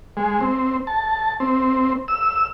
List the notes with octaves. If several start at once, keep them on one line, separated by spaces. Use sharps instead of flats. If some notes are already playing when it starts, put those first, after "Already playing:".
G#3
C4
A5
C4
E6